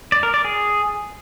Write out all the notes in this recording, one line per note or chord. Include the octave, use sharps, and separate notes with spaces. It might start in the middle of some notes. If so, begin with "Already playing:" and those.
D5
A#4
D5
G#4